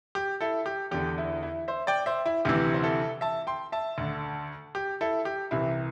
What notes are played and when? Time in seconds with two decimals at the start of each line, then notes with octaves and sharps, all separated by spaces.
0.15 G4
0.41 E4 A4
0.66 G4
0.91 E2 D3 G4
1.18 E4
1.43 E4
1.68 C5 E5
1.87 D5 G5
2.06 C5 E5
2.26 E4
2.45 D2 C3 E3 G4
2.74 C5
2.83 E4 A4
3.21 E5 A5
3.47 G5 C6
3.72 E5 A5
3.98 D2 D3
4.75 G4
5.01 E4 A4
5.25 G4
5.51 C2 C3 E3 E4